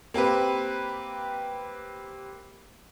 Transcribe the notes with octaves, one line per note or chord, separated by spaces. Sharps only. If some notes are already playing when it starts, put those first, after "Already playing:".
A#3 C4 G4 B4